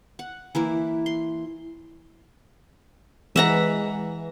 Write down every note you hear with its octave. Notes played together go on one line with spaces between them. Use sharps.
F#5
E3 A#3 E4
C6
E3 G#3 E5 F#5 A#5